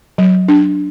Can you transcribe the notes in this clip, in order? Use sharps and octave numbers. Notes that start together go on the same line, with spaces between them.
F#3
D4